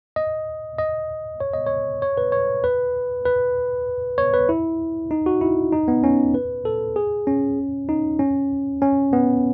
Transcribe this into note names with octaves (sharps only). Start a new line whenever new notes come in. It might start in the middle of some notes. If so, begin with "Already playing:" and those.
D#5
D#5
C#5
D#5
C#5
C#5
B4
C#5
B4
B4
C#5
B4
E4
D#4
F#4
E4
D#4
B3
C#4
B4
A4
G#4
C#4
D#4
C#4
C#4
B3